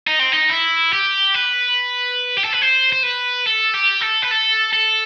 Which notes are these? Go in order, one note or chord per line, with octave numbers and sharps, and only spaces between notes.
D#4
C4
D#4
E4
G4
B4
G4
A4
B4
C5
C5
B4
A4
G4
A4
B4
A4
A4